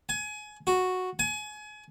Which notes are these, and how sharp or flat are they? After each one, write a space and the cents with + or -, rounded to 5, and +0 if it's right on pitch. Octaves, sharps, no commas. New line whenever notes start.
G#5 +25
F#4 -5
G#5 +30